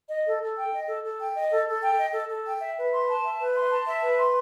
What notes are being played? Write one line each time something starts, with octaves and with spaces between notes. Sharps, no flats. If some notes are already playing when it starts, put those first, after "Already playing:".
D#5
A4
A4
G5
D#5
A4
A4
G5
D#5
A4
A4
G5
D#5
A4
A4
G5
E5
B4
C6
A5
E5
B4
C6
A5
E5
B4
C6